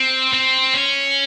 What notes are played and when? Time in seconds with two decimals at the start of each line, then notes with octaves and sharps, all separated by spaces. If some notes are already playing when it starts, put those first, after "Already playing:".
Already playing: C4
0.33 C4
0.74 C#4